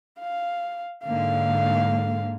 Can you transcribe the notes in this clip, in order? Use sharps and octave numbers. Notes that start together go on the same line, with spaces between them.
F5
G#2 D3 A#3 F5